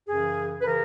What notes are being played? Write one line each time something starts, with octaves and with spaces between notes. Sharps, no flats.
F#2 C#3 E3 G#4
B4
C#3 E3 A#4